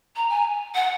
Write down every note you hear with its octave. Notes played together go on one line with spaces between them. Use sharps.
A#5
G#5
F#5